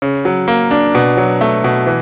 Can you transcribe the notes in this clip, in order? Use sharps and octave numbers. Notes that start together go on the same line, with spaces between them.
C#3
F#3
A#3
D4
B2
F#3
A3
B2
E3